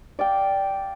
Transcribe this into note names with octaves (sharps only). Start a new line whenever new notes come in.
D5 F5 G5